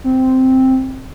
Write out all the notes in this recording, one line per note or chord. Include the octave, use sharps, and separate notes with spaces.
C4